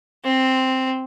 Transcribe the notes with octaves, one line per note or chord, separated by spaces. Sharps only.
C4